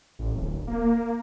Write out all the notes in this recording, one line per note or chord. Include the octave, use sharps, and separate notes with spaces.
A1
D1
A#3